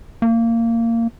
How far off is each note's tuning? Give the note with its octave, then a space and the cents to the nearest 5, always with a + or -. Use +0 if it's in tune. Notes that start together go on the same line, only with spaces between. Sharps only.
A#3 -20